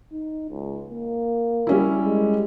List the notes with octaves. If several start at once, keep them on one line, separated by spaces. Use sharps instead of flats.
D#4
C#2
A#3
G3 C#4 E4
G#3